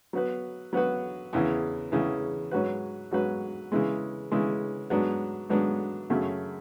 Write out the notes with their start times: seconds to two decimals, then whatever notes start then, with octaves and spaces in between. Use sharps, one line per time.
0.13 F#3 B3 F#4 B4
0.73 F#3 B3 F#4 B4
1.33 E2 C#3 E3
1.92 E2 C#3 E3
2.51 G#2 F#3 C#4 F#4 B4
3.11 G#2 F#3 C#4 F#4 B4
3.72 C#3 E3 G#3
4.31 C#3 E3 G#3
4.90 G#2 F#3 B3 D4
5.50 G#2 F#3 B3 D4
6.10 F#2 C#3 F#3 A3